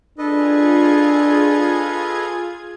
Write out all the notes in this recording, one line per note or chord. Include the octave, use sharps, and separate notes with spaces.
D4 F4 G#4 A4 B4 D#5 G#6